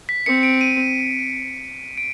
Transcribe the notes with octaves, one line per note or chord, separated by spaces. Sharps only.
B6
C4 C#7
D7
D#7
D7